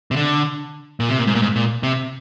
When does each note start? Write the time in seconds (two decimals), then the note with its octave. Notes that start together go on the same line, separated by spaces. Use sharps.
0.11 C3
0.16 D3
1.00 A#2
1.09 C3
1.18 A#2
1.27 G#2
1.35 A#2
1.42 G#2
1.56 A#2
1.83 C3